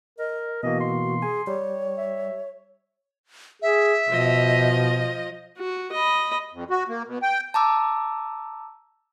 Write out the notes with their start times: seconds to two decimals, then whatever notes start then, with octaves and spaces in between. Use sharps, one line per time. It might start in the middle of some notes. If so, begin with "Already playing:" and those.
0.19 A#4 D#5
0.63 B2 E3 A#3 F#4 D#5
0.80 C6
1.22 G#4 G#5
1.47 G3 C#5
1.97 E5
3.62 G#4 E5
4.09 B2 F3 D#5
5.57 F#4
5.92 D#5 B5
6.51 F2
6.71 F#4
6.89 A#3
7.06 B2
7.23 G5
7.54 A5 A#5 D6 E6